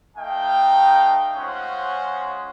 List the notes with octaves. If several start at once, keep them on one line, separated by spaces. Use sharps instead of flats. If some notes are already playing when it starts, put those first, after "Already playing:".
A3 D#4 D#5 F5 G5
G#3 C#4 F4 G#4 C5 F#5